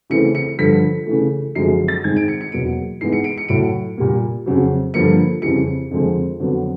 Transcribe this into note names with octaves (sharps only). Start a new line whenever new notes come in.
C#3 E3 A3 C4 C#7
C#7
G2 D3 F3 B6
C#3 E3 A3
F#2 D3 F3 G#3 C4 C7
A6
G#2 D#3 G#3 C4 G#6
D7
C#7
C#7
E2 B2 F#3 A#3 D7
G#2 E3 G#3 B3 C7
C#7
D7
C#7
A2 F#3 A3 D7
A#2 G3 A#3
F2 C#3 F#3
G2 D3 F3 A#3 C#7
F2 C#3 E3 G3 C#7
F2 D3 F3 G#3 C4
F2 D3 F#3 B3